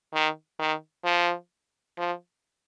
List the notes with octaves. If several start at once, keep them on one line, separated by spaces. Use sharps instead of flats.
D#3
D#3
F3
F3